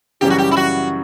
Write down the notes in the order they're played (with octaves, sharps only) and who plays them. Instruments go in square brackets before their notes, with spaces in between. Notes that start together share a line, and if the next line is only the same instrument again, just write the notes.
[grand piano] F#2 C#3 E3 G3 [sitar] G4
[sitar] F#4
G4
E4
F#4